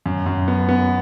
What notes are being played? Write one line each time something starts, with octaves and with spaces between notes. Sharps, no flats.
F#2
F#2
B3
B3